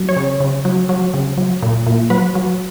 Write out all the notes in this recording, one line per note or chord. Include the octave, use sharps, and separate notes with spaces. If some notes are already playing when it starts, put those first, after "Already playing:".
Already playing: F#3
C#5
C#3
C#3
F#3
F#3
C#3
F#3
A#2
A#2
F#3 B4
F#3